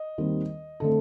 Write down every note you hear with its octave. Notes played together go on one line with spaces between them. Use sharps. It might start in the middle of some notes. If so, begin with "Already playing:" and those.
Already playing: D#5
D#2 D#3 G3 C4
D3 A3 C4 A4